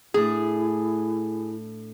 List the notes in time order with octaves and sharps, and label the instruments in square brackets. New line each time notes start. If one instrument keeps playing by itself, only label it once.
[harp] A2 A3 D4 [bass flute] E4 [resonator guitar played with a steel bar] G#4